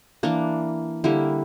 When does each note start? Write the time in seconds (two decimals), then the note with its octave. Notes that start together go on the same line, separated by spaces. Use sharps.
0.23 E3 A#3 D4
1.04 D3 G3 A#3 E4